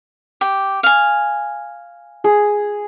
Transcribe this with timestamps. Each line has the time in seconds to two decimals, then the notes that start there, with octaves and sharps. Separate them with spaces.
0.41 G4
0.83 F5 G#5
2.24 G#4